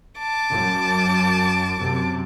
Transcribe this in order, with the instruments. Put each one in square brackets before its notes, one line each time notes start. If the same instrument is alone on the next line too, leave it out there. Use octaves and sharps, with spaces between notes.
[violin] A5 D6
[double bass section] F#2
F#2 C3